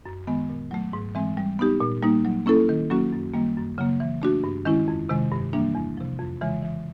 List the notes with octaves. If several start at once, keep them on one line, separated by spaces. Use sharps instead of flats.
F#2
D#3 G#3 B3
A#2
F#3 A3
G#2
E3 G#3 C4
G3
B3 D#4 G4
A#2
G3 A#3 D#4
F#3
A#3 C#4 E4 A4
D#3
F#3 A#3 C#4 F#4
F#2
D#3 G3 A#3
F#2
C#3 F#3 A#3
E3
A3 D4 F#4
G2
D#3 G#3 C#4 E4
F2
C3 D#3 G#3
G2
E3 G3 A#3 D4
E2
C3 F3
F2
C#3 E3 G#3
E3